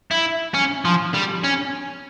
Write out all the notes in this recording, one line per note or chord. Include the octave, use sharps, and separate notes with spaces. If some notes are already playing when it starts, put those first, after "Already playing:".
E4
C#4
F3
G3
C#4